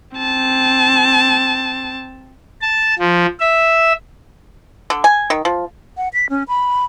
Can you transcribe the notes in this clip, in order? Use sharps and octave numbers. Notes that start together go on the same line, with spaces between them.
C4 A5
A5
F3
E5
D3
G#5
D#3
F3
F#5
B6
C#4
B5